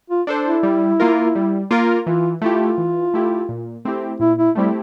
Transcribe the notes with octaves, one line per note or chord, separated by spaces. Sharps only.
F4
D4 A4 C5
E4
G3
A#3 F4 A#4
G3
A#3 F4 A#4
E3 F4
A3 E4 F4 G4
E3
A3 E4 G4
A#2
A3 C4 E4 G4
A#2 E4
E4
G3 A3 C4 E4 G4